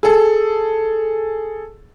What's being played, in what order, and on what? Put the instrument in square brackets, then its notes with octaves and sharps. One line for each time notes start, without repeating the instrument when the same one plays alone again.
[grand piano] G#4 A4